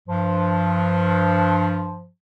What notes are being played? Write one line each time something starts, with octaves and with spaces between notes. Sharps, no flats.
G2 F3